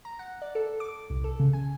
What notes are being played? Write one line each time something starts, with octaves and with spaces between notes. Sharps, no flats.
A#5
F#5
D5
A4
D6
C2
A4
C#3
G#5